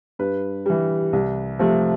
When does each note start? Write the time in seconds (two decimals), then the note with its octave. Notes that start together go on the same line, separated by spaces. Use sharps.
0.19 G2 B4
0.66 E3 G3
1.13 C2
1.59 C3 F3 A3